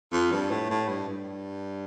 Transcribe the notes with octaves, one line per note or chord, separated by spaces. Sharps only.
F2
G2
A2
A2
G2
G2